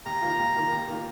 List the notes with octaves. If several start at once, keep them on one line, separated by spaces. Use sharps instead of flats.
D#2 A#5
D#3 A#3 F4
D#2
D#3 A#3 F4
D#2
D#3 A#3 F4